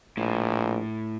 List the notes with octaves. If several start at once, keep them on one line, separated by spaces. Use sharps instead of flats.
A#1 A2